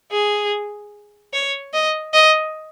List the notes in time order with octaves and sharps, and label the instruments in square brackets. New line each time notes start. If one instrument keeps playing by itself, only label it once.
[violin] G#4
C#5
D#5
D#5